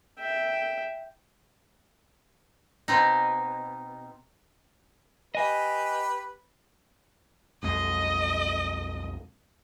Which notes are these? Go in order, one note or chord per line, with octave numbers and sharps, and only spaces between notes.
E5 G5
B2 C4 D#4
G4 B4 D#5 G#5
B1 F2 G#3 D#5